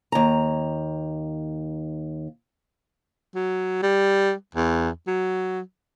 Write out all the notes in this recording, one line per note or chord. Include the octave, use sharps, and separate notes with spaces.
D#2 A#5
F#3
G3
E2
F#3